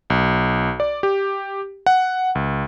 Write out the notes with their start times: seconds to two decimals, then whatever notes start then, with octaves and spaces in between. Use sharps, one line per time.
0.10 B1
0.80 D5
1.03 G4
1.86 F#5
2.35 C#2